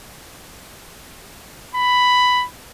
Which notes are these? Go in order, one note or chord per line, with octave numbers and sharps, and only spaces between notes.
B5